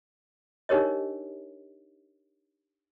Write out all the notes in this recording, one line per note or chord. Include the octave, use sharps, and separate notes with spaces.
D4 D#4 G4 A#4 C#5 D#5